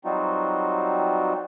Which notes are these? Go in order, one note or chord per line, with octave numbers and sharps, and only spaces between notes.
F#3 G3 C4 D#4 F4 F#4